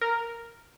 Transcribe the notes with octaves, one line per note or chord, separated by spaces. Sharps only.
A#4